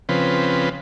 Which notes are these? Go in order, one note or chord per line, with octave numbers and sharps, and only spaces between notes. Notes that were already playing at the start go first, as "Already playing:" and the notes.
C#3 F3 C4 B4